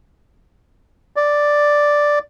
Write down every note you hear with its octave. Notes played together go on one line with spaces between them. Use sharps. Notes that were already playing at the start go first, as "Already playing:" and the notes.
D5